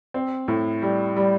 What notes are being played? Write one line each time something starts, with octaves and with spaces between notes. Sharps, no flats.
C4
A2
G3
G3